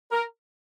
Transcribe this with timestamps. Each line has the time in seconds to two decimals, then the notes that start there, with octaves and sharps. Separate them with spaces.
0.12 A#4